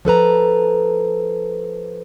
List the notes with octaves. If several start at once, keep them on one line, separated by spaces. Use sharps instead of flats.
F3 A4 B4 A#5